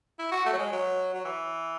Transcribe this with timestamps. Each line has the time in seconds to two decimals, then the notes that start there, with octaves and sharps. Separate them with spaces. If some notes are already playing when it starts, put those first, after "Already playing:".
0.19 E4
0.32 F#4
0.45 A3
0.53 F#3
0.58 G#3
0.72 F#3
1.14 F#3
1.25 E3